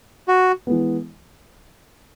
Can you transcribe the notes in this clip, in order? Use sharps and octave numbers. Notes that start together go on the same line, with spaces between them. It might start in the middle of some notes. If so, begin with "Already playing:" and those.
F#4
E3 G#3 B3